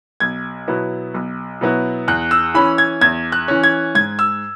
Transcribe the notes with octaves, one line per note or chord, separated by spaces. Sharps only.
B1 G#6
B2 F#3 B3 E4
B1
B2 F#3 B3 E4
E2 F#6
E6
E3 C#4 B5
G#6
E2 G#6
F#6
E3 C#4
G#6
G#2 G#6
E6